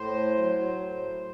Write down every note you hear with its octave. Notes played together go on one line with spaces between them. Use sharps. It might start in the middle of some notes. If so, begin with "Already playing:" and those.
Already playing: A2 C5
F#3
A2